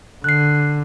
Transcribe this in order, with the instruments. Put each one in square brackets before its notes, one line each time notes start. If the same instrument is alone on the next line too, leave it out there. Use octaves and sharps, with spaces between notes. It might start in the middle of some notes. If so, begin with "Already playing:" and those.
[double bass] D3 [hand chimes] F#6 C7